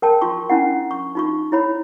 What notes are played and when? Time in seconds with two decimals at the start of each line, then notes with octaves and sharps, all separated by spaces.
0.02 A#4 G5 A5
0.21 F4 C6 C#6
0.50 C#4 D4 E4 F#5
0.91 C#6
1.15 D#4 F4 C#6
1.52 E4 C#5 B5